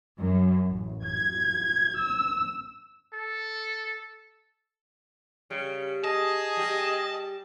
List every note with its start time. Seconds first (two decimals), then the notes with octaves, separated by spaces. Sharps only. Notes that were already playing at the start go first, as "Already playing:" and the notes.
0.19 F#2
0.70 A1
1.05 G#6
2.00 E6
3.13 A4
5.50 C#3 G3
6.04 G#4 D#5 A5
6.57 G3 G4